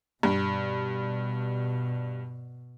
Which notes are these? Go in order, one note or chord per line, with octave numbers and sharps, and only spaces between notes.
G2 B2